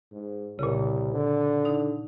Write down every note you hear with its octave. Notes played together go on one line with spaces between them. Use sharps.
G#2
C2 A#2 C#3
D3
D#4